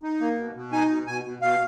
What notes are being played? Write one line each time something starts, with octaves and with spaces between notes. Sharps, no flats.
D#4
A#3
B2
B2
D#4 G#5
B2
B2 G#5
B2
B2 F5